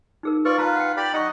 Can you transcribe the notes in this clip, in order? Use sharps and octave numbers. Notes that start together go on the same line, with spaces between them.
D#4 G#4 A#4
F4 B4 D5 C#6
F4 B4 A5 A#5
F#5 G5
G4 D5 B5
D#4 D#5 F#5 A#5 C#6